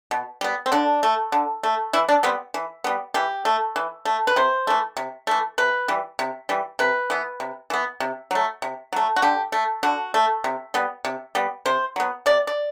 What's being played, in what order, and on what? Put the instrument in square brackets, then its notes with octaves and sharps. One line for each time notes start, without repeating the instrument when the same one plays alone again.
[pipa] B2
G3 B3
C4
D3 D4
A3
D3
A3
E3 E4
D4
G3 B3 C4
E3
G3 B3
E3 G4
A3
E3
A3
B4
C3 C5
E3 A3
C3
E3 A3
C3 B4
E3 G3
C3
E3 G3
C3 B4
E3 B3
C3
E3 B3
C3
F#3 A3
C3
F#3 A3
F#4
D3 G4
A3
D3 F#4
A3
C3
G3 B3
C3
G3 B3
C3 C5
F#3 B3
C3 D5
D5